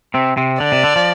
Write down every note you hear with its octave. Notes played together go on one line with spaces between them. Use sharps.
C3 C4
C3 C4
D3 D5
C3
D3
F3